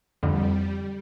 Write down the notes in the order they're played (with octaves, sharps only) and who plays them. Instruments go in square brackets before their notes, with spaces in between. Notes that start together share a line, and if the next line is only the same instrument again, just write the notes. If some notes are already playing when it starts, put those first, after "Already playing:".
[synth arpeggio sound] F2 A2 D3 [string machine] G3